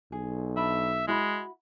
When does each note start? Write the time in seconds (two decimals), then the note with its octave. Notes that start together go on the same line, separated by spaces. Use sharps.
0.12 B1 G#4
0.57 D4 E5 B5
1.07 G#3 E4 F#4 B5